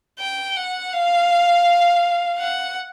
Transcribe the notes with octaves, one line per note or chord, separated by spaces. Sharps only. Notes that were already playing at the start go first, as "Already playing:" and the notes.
G5
F#5
F5
F#5